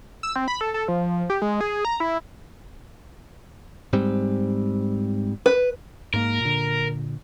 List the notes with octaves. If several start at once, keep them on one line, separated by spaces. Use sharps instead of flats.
E6
C4
B5
A4
A4
F3
G4
G#3
G#4
A#5
E4
G#2 G3 C4
B4
G#2 A#3 A#4
A#2 D3